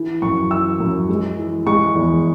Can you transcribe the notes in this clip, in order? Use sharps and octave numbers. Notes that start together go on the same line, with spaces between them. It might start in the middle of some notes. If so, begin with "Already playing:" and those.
Already playing: E3
F#2 C#6
E3 E6
F#2
G#3
E3
G#3 C#6
E2